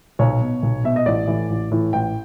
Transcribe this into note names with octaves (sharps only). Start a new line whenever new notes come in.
B1 C#5
B2
B1
B2 E5
D#5
A1 D5
A2 E3
A1
A2 E3
A1 G5